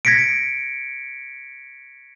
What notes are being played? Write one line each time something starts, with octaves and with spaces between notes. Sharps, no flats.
G#6 A#6 B6 C#7 D7